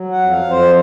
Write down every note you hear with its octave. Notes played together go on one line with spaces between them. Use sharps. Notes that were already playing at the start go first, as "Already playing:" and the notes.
Already playing: F#3
F#5
F2
F5
F2
C5